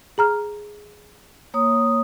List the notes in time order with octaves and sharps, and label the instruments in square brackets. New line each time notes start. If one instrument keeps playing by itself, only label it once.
[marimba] G#4 A#5 F6
[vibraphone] A#3 C#5 D#6